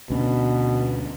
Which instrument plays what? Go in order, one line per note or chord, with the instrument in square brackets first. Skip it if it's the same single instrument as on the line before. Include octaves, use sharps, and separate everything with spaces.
[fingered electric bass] D2 C#4 D4 [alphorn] B2